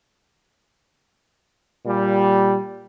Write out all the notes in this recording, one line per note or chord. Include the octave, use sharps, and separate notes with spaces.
A#2 G3